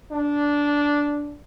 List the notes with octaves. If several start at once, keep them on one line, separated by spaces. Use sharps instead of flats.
D4